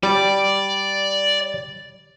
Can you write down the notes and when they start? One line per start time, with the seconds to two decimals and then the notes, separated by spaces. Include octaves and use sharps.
0.03 G3 D5